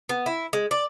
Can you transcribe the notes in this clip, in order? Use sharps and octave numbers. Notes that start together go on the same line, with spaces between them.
B3
E4
G#3
D5